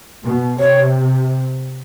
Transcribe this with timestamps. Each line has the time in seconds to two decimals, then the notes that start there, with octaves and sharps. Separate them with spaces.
0.23 B2
0.60 C3 C#5